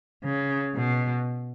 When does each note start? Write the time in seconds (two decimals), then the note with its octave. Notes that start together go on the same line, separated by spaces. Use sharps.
0.24 C#3
0.75 B2